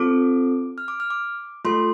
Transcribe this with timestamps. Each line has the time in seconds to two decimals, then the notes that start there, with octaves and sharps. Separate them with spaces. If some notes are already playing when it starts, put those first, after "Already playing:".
Already playing: C4 F4 A4 D6
0.78 F6
0.88 D6
1.00 F6
1.10 D6
1.65 A3 F4 A4 C6